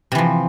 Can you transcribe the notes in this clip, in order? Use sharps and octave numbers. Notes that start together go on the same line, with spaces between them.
C3 E3 F3